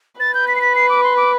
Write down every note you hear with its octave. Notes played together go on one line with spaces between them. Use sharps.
B4 A6
G6
B6
C7
B6
C7
D6
C6
D6